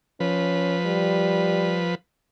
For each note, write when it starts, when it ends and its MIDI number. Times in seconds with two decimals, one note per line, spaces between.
0.20 1.95 53
0.20 0.78 61
0.20 1.95 71
0.86 1.89 55